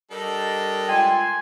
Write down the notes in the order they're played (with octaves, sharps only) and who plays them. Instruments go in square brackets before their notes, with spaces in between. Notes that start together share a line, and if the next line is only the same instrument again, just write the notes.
[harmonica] G3 D4 A4 [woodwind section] A#4 D#5
[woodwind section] G#3 F4 C6 [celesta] G5 [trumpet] G#5